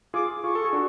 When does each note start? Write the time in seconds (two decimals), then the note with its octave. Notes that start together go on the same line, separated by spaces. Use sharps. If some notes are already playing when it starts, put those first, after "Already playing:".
0.14 F4 G#4 D6
0.43 F4 G#4 C#6
0.55 A4
0.64 G#4
0.73 D4 F#4